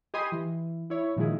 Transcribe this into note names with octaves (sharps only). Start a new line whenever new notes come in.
G4 D#5 G#5 B5 C6 D#6
E3
E4 C#5
A#2 D#3 F3 G#3 E4 G#4